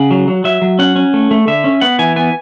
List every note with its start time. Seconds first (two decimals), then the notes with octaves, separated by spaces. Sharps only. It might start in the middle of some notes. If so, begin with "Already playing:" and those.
Already playing: C#3 F#5
0.11 F#3
0.28 F#3
0.44 F#3 E5
0.62 F#3
0.79 C#4 F#5
0.96 C#4
1.14 A3
1.31 A3
1.47 D3 E5
1.64 C#4
1.81 B3 F#5
1.99 E3 G#5
2.16 B3 G#5